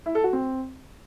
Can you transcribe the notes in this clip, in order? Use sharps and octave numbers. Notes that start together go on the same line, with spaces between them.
E4
A4
F#4
C4